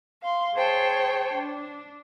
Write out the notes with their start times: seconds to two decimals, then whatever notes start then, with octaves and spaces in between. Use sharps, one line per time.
0.22 F5 C6
0.55 G#4 C5 C#5 G5 A5
1.34 D4